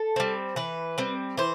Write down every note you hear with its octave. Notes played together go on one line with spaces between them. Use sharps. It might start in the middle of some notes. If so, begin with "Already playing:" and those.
Already playing: A4
G3 C4
E3 B4
G3 C4
E3 C5